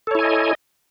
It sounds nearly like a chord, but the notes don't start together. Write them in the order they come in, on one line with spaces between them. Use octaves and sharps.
A4 C#5 E4 G#5 D#5